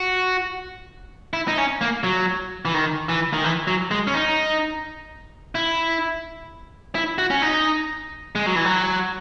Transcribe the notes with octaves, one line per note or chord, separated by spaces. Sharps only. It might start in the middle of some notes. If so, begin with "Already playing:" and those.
Already playing: F#4
E4
D#4
C#4
A#3
F#3
E3
D#3
E3
D#3
E3
F#3
G#3
C#4
D#4
E4
E4
F#4
C#4
D#4
G#3
F#3
E3
F#3